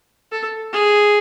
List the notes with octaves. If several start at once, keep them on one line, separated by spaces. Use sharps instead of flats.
A4
G#4